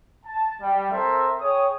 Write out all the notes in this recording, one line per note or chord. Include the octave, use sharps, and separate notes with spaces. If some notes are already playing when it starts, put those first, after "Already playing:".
A5
G3
C4 A4 A#4 C5 E5
G#4 C#5 G5 D#6